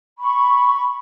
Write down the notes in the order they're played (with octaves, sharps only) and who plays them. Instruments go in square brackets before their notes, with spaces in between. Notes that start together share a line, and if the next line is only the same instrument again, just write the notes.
[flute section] B5 C#6